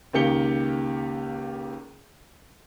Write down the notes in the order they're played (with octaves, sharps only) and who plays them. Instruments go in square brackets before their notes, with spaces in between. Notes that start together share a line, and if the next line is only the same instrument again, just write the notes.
[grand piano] C#2 D#3 A#3 G4 C#7 G7